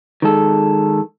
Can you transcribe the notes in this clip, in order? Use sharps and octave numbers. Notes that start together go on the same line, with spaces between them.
D#3 G#3 A4